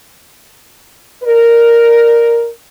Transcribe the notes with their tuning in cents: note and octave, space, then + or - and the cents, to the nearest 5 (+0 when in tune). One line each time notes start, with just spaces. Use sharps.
A#4 +0 D5 +30